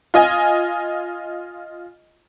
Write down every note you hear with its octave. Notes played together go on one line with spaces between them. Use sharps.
F4 D#5 G#5